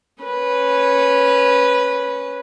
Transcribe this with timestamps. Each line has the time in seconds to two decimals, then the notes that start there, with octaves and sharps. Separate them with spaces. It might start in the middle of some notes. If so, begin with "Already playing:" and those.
0.23 C#4 B4